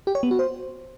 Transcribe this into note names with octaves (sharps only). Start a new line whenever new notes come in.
G4
C#5
B3
F#4
C5